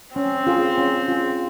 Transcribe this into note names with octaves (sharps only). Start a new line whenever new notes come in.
C4 C#4
F4 G#4
C#4
F4 G#4